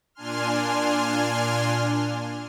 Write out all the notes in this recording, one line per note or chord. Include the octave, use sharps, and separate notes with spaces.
A#2 D4 G#5 C6 F6